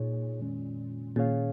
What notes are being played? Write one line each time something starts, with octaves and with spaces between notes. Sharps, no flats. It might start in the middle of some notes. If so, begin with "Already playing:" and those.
Already playing: A#2 A#3 D#4 G#4 C#5
F2 D#3 G#3 C#4
A#2 D#3 C#4 G#4 C#5 F5